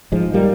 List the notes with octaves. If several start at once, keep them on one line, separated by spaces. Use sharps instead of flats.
G#2 F3 G#3
G3 A#3